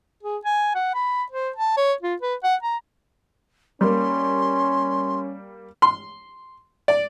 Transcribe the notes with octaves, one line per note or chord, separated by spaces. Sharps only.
G#4
G#5
F#5
B5
C5
A5
C#5
F4
B4
F#5
A#5
G3 A#3 C#4 C6
C6
D5